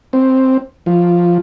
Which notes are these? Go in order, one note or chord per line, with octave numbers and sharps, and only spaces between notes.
C4
F3